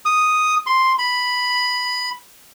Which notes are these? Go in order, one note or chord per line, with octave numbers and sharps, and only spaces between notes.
D#6
C6
B5